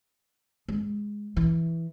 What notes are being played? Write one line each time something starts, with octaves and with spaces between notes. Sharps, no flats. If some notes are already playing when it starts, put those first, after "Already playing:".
G#3
E3